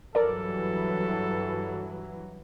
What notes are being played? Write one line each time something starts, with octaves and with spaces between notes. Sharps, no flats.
G2 E3 F#3 A4 A#4 D5